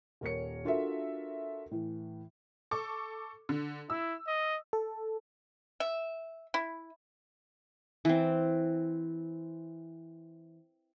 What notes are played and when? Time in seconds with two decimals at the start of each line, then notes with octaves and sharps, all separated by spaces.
0.21 D#1 A#4 C#5 C#7
0.65 D4 F4 F#4 A4 A#4 E5
1.71 A2 E3
2.71 A4 C#6 D6
3.49 D3
3.90 E4 E6
4.27 D#5
4.73 A4
5.80 E5
6.54 E4
8.05 E3 C4